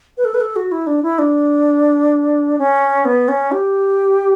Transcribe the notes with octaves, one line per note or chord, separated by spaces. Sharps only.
B4
A4
B4
A4
F#4
E4
D4
E4
D4
C#4
B3
C#4
G4